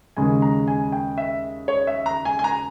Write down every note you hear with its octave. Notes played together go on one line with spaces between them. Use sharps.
D#2 C#3 G#3 G#5
A#5
G#5
G5
E5
C#5
E5
A#5
G#5
G#5
A#5